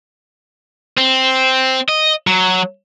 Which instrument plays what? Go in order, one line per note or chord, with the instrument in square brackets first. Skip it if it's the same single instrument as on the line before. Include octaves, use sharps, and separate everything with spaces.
[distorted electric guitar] C4
D#5
F#3